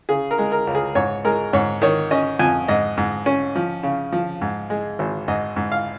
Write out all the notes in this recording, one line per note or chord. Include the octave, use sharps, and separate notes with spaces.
C#3 G#4
A#4
G#3
A#4
C#2
G#4
G#2 C#5
G#3 A#4
G#2 C#5
D#3 C#5
C#4 D#5
F2 G#5
G#2 D#5
G#2
C#4
F3
C#3
F3
G#2
G#3
G#1
G#2 D#5
G#2
F5